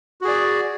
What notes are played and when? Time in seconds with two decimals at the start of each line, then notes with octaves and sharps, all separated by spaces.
0.21 F#4
0.25 G#4
0.28 D5